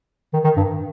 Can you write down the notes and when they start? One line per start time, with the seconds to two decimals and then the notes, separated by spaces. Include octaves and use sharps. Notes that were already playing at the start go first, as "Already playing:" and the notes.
0.33 D#3
0.44 D#3
0.57 G2